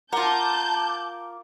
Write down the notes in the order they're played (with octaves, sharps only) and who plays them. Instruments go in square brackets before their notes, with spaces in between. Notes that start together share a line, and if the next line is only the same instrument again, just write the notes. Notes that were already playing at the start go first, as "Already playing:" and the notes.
[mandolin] F4 A#4 [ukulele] F#5 A#5 [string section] A5 G6 [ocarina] D6